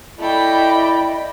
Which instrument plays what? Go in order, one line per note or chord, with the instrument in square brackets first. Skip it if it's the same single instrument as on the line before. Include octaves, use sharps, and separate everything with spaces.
[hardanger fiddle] A3 G5 [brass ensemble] E4 D5 [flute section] D#5 B5